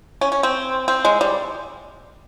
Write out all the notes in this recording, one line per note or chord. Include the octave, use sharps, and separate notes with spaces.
C#4
C#4
C4
C4
G#3
G3